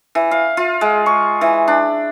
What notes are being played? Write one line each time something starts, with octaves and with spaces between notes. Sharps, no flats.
E3
F5
F4
G#3
C#6
E3
D4